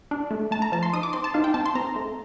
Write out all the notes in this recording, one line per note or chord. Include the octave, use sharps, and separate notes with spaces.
D4
A3
A3 A5
A#5
F3 A5
C6
D#4 D#6
D6
C4 C6
A5
D#4 F5
G5
C4 A5
C6
C4 A#5
A3